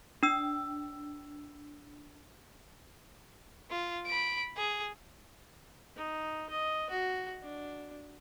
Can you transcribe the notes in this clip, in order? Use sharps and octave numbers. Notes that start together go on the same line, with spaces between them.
D4 E6
F4
B5 D7
G#4
D#4
D#5
F#4
D4